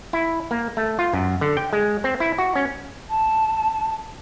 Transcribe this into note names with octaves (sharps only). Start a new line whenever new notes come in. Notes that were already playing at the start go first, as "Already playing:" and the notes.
E4
A#3
A3
F4
F#2
D3
G5
G#3
C4
E4
F#4
C#4
A5